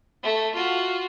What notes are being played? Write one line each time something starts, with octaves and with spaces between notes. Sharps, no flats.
A3
F4 F#4